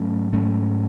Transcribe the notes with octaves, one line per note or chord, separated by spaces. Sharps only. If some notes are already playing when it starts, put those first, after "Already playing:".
Already playing: G#2 F#3 A3 C#4
G#2 F#3 A3 C#4